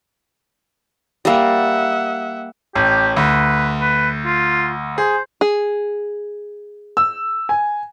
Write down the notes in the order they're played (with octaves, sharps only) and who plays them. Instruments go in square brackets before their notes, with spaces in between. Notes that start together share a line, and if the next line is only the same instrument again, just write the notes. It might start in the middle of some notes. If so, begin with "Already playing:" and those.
[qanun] G3 A#3 [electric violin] E5 F#5
[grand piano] A1 [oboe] G4
[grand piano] D2 [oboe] B4
[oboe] B4
F4
[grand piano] G#4 [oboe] C5
[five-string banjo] G#4
[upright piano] E6
G#5